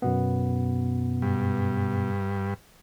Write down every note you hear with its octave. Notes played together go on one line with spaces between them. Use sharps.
F#2 B2 B3
G2